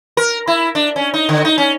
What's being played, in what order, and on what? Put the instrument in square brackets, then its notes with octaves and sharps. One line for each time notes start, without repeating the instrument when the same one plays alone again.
[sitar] A#4
E4
D4
C#4
D#4
D3
D#4
C#4